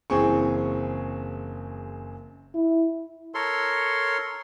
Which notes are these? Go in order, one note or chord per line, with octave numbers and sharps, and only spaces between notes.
F#1 E3 C4 G#4 C#6
E4
A4 A#4 C#5 C6